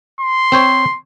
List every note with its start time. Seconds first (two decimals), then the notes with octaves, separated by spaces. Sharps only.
0.21 C6
0.52 C4 C5 C#5